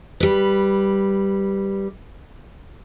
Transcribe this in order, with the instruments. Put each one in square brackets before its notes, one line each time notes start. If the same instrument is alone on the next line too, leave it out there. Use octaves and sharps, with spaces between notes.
[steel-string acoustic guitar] G3 B4